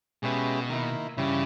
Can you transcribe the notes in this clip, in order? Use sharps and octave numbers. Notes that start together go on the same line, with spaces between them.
B2 G#3 C#4 G4 B4 E5
D#3 A#3 E4
G2 C#3 E3 G3 C#4 E4